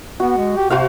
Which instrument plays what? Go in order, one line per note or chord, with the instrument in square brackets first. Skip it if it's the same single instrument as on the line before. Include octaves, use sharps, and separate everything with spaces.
[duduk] B3 [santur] F#4
[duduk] G#3
G4
[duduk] C3 [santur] F#4 C5 F5